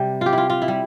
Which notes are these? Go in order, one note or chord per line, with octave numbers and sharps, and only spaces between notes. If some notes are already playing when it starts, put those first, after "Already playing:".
Already playing: C3 G3
F4 G4
E4 F4
F4
E4
G3